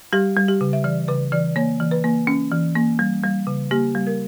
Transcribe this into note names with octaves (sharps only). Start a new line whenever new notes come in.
G3 G4
G3
G4
C#3
E5
E3 D5
C#3 B4
E3 D5
A#3 C#5
E3
B4
A#3
C#4
E3
A#3
G3
G3
C#3
A#3 G4
G3
A#4